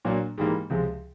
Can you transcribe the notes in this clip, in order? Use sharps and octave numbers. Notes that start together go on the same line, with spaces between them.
A#2 F#3 A#3 D4
G#2 E3 G3 A#3
C#2 C3 F3 G#3